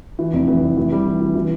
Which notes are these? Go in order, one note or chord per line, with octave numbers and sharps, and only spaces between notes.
E3
F1
E3
F1
E3
G3
E3
E3
E3